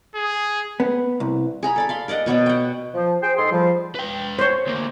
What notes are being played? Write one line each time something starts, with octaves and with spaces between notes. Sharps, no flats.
G#4
B3
C2
G#4 A#5 B5
A4 D5 B5
F5 B5 C6
A#4 D5 D#5 F#5
B2 B3 C#5 D5
F#5 G5
F3
G#4 C5 G5
G#2 G#4 A4 C6
F3 G3
B4 G5
C5 C#5
D2 A#3